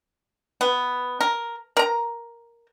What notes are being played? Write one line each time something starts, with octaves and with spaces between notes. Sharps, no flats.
B3
A#4
A#4 A#5